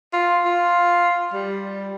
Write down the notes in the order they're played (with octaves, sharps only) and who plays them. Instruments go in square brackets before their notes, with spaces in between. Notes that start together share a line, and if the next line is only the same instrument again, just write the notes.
[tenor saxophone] F4
F4
G3